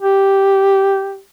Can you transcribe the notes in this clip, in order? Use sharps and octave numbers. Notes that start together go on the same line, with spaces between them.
G4